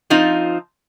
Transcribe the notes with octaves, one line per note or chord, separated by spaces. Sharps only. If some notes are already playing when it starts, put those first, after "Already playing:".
F3 C4 D#4 F4